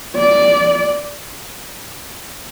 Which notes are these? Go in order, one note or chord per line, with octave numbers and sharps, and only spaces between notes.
D5